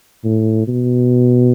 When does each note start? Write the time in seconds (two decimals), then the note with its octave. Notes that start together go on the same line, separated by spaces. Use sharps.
0.24 A2
0.67 B2